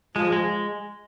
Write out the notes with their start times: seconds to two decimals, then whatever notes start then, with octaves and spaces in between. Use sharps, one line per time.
0.16 F3 G#3
0.32 G#3